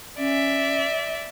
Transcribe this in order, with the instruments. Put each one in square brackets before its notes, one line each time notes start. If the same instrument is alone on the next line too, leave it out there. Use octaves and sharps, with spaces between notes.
[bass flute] C#4 [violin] D5 E5